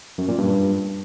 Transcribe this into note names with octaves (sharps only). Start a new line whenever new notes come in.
F#2
A#2
G2